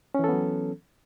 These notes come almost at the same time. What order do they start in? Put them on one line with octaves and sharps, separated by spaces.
C#4 E3 A4 B3 F#3